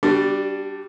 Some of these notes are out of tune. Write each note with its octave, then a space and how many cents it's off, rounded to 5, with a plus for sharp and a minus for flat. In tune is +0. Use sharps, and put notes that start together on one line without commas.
G3 +0 D4 +0 F#4 +35